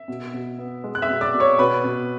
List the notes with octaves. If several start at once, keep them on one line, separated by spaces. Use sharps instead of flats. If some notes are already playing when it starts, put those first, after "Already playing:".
Already playing: E5
B2
B2
B3
G#3
F#6
E5 E6
B2
D5 D6
B2
C#5 C#6
B2 B4 B5
B2